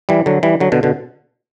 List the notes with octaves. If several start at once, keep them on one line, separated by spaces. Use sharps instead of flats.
E3 G3
D3 F#3
E3 G3
D3 F#3
B2 D3
B2 D3